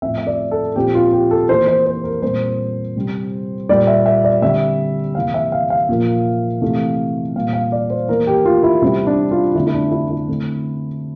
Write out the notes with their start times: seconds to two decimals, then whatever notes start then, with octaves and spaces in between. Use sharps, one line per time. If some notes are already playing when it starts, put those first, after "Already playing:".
0.02 A2 F3 C4 E5
0.18 E5
0.27 D5
0.51 A4
0.76 A#2 F3 C4 G4
0.95 F4
1.13 G4
1.31 A4
1.49 E3 A#3 C5
1.67 C5
1.86 C5
2.04 A#4
2.22 A#2 G3 C4 C5
2.96 C3 G3 C4
3.69 A#2 G3 A#3 D5
3.87 E5
4.06 E5
4.24 D5
4.42 D3 G3 C4 E5
5.15 C3 E3 A#3 F5
5.34 E5
5.52 F5
5.70 F5
5.89 A#2 F3 A#3
6.62 C3 E3 A3
7.35 A#2 G3 A#3 F5
7.53 F5
7.72 D5
7.90 C5
8.08 E3 A#3 A#4
8.27 G4
8.45 F4
8.63 E4
8.82 C3 G3 C4 E4
9.07 D4
9.31 F4
9.55 D3 A3 C4 E4
9.67 E4
9.74 D4
9.92 E4
10.10 E4
10.28 D3 A3 C4